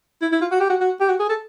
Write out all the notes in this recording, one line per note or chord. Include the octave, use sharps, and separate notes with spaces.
E4
E4
F4
F#4
G4
F#4
F#4
G4
F#4
G#4
A4